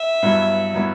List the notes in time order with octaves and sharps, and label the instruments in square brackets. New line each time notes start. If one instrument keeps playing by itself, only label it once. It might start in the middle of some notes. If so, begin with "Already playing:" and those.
Already playing: [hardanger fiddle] E5
[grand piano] G2 F#3 B3 E4
F#3 B3 E4